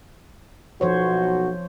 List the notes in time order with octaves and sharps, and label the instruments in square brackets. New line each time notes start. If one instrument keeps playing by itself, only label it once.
[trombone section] B1 F#4 [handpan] F3 C5 C#5